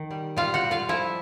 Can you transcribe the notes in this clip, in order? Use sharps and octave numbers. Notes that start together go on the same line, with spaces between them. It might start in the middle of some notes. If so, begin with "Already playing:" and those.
Already playing: D#3
G3
G3 F4 F5
F#4 F#5
G3
F4 F5
F3 E4 E5